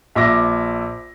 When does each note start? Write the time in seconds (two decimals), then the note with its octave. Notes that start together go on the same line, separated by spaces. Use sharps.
0.15 A#1 E5 D6 A#6